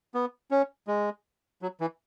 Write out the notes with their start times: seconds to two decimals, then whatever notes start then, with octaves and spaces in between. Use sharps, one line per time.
0.14 B3
0.51 C#4
0.87 G#3
1.62 F#3
1.81 E3